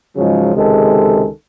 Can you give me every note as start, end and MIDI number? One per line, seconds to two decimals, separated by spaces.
0.16 0.52 44
0.16 0.52 49
0.16 0.52 53
0.16 0.52 54
0.16 0.52 56
0.54 1.28 37
0.54 1.28 48
0.54 1.28 51
0.54 1.28 56
0.54 1.28 69